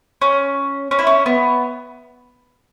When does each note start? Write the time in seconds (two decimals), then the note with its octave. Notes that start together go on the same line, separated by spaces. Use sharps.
0.22 C#4
0.91 C#4
0.99 E4
1.07 C#4
1.26 B3